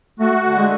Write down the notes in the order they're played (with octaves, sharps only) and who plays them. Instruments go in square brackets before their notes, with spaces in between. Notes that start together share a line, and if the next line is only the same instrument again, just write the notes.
[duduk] A3 [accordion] F#4
[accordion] D3
[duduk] G#3